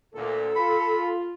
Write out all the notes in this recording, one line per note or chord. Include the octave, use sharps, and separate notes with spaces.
D2 A#2 A4
F4 B5